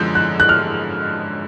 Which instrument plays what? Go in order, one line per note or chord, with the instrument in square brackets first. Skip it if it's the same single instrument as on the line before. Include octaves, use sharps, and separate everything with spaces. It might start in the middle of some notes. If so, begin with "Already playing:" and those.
Already playing: [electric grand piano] F#2 D3 F3 G#3 [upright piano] G6
[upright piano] F#6
F#6
F6